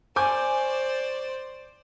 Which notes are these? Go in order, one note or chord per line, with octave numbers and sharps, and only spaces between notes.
C5 D5 G#5 C#6 D6 G6